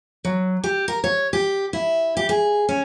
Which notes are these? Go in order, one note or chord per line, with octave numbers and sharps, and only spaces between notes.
F#3
G4
A#4
C#5
G4
E4
G4
G#4
C#4